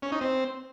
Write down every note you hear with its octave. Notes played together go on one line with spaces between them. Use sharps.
C#4
D#4
C4